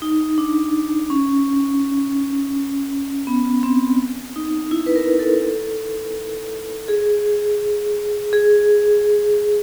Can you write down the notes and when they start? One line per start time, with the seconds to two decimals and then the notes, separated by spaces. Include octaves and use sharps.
0.02 D#4
0.38 D4
1.10 C#4
3.27 B3
3.63 C4
4.36 D#4
4.71 E4
4.86 B4
4.96 A#4
5.19 A4
6.88 G#4
8.33 G#4